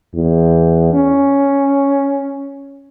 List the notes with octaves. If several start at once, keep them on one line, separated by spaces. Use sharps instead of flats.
E2
C#4